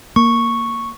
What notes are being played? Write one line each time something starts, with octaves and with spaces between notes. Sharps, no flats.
A#3 C#6